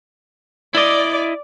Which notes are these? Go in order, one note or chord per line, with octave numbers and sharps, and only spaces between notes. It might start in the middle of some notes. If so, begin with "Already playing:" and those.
E4 D5 D#5